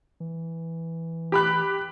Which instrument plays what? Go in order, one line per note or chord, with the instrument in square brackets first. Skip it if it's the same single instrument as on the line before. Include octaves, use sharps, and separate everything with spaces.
[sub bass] E3
[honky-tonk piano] G4 B5 F#6